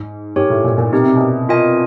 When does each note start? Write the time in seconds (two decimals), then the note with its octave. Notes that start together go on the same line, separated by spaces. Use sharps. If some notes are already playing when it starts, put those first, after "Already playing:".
Already playing: G#2
0.36 G#2 G4 A#4 C#5
0.50 A2
0.64 A#2
0.78 A#2
0.92 B2 C4 D#4 G4 A#4
1.04 C3
1.15 B2
1.49 C4 F4 A#4 D#5 G#5